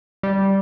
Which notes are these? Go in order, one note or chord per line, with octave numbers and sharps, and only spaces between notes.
G3